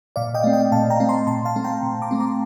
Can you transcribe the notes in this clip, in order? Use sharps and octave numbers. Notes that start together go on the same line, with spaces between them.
A#2 D5 F5
D#5 G5
A3 C4
D#5 G5
A#2 F5 A5
G5 A#5
A3 C4
A5 C6
A#2 A5 C6
F5 A5
A3 C4
G5 A#5
A#2
A#5 D6
A3 C4
A#5 D6